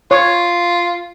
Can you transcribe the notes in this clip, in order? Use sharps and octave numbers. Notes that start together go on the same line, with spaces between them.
F4 C#5